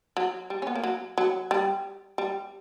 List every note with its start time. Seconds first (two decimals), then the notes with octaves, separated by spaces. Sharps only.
0.17 F#3
0.50 G3
0.62 C#4
0.67 B3
0.75 A#3
0.83 F#3
1.18 F#3
1.51 G3
2.18 G3